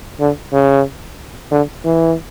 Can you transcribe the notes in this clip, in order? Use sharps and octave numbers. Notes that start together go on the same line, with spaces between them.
D3
C#3
D3
E3